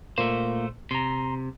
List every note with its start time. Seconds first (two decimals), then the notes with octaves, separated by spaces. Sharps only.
0.18 A#2 A3 A#3 C5
0.91 C3 A#5 C6